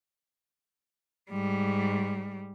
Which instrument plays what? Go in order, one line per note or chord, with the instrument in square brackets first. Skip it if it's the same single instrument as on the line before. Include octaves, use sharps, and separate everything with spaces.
[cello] G#2 G3